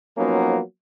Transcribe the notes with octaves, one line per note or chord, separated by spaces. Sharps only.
F3 F#3 A#3 B3 C#4 D#4